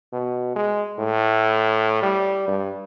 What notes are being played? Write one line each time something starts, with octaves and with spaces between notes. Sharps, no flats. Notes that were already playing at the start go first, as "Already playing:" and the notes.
B2
G#3
A2
G3
G2